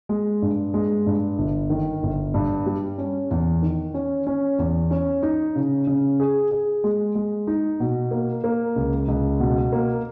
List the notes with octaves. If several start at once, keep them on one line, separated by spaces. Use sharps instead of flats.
G#3
G2
G#3
G2
G1
D#3
G1
G2
G3
C#4
E2
D#3
C#4
C#4
E2
C#4
D#4
C#3
C#3
G#4
G#4
G#3
G#3
D#4
B2
A#3
A#3
C#2
C#2
B2
A#3